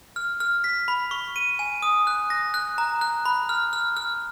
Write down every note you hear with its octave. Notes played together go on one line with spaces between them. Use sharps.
F6
F6
B6
B5
C#6
D#7
G#5
D#6
F#6
A#6
F#6
A#5
F#6
B5
F6
F6
F6